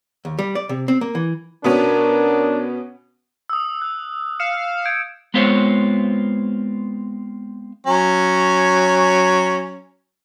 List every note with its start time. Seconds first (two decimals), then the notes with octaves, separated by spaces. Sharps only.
0.25 D#2
0.39 G3
0.55 D5
0.69 C3
0.88 C4
1.01 A#3
1.15 E3
1.64 B2 B3 C#4 D4 A#4
3.49 D#6 E6
3.82 F#6
4.40 F5 C#7 E7
4.85 G6 G#6 D7
5.34 G#3 B3 C4 F4 C5 C#5
7.87 F#3 C#4